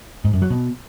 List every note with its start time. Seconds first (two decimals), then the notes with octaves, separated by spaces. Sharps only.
0.25 G#2
0.33 F#2
0.42 F#3
0.50 B2